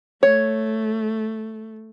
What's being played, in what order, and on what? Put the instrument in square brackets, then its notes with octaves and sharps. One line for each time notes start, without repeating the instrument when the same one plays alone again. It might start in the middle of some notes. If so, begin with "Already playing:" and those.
[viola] A3 [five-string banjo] C#5